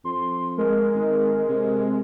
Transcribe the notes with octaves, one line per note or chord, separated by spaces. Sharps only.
F2 C6
G#3 A#4
G#1
C3